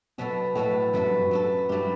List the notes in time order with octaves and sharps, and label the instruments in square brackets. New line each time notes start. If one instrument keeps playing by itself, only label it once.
[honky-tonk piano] B2 [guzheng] F#3 B3 F#4 A4
[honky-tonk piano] A2 [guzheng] F#3 B3 F#4 A4
[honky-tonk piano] F#2 [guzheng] F#3 B3 F#4 A4
[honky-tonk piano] G2
F#2
[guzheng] F#3 B3 F#4 A4
[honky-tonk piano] G2 [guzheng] F#3 A3 E4 G4